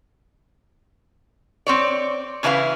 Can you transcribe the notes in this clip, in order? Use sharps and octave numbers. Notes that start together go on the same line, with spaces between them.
C4 C#5 D5
C#3 E3 D4 E4 B4 F5